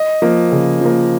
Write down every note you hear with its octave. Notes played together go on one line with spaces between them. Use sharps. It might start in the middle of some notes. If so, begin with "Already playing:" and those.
Already playing: D#5
F3 A#3
C#3
F3 A#3